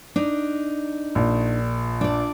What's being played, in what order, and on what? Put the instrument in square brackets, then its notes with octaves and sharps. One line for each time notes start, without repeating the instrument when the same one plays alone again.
[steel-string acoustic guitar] D4 D#4
[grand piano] A#1
[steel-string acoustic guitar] D4 D5